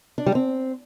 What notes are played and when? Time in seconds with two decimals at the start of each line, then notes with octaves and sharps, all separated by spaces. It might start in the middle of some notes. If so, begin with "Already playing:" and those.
0.18 D4
0.26 G3
0.35 C4